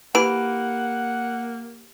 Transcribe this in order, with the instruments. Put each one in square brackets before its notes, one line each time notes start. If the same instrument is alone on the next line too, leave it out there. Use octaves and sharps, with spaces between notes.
[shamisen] E3 [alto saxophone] A#3 [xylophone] G4 B5 D7 [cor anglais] F#5